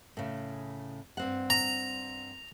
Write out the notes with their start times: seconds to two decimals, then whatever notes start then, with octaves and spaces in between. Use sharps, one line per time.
0.17 A2 C#3
1.17 G2 C4 F#5
1.50 A#5